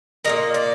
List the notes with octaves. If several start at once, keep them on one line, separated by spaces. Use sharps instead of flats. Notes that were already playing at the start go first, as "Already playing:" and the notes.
A#2 G3 A#3 D#5
D5